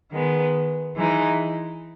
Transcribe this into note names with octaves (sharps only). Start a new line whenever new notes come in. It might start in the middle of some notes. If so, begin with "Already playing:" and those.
D#3 G#3 B3
E3 G#3 D#4